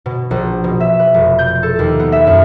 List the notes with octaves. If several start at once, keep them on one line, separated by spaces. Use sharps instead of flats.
B2
A#1
B2
E5
B4
F1
G6
A4
D#2
B3
E5
F#2